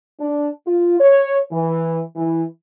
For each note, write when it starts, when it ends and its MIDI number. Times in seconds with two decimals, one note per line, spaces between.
0.20 0.49 62
0.67 0.96 65
1.00 1.39 73
1.52 2.01 52
2.16 2.44 52